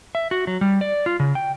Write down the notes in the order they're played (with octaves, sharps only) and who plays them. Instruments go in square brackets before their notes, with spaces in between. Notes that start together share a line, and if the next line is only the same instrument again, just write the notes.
[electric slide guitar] E5
F#4
F#3
G3
D5
F4
C#3
G5